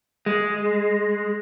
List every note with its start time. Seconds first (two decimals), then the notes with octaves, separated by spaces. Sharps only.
0.26 G#3